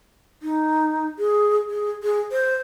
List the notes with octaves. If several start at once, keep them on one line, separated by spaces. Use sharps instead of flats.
D#4
G#4
G#4
G#4
C5